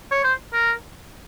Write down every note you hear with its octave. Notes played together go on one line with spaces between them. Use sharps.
C#5
C5
A#4